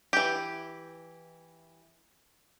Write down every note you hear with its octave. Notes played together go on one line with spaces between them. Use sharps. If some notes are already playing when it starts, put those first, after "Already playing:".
E3 G4